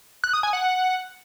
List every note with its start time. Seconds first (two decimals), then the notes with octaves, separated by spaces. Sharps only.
0.24 F#6
0.33 D#6
0.43 G#5
0.53 F#5